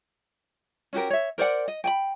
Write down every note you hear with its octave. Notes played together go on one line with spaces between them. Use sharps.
C#4 F#4 G4 A#4
C#5 E5
A#4 C5 D5 F#5
D#5
G5 G#5 B5